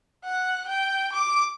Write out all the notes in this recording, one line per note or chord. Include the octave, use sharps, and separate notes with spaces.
F#5
G5
D6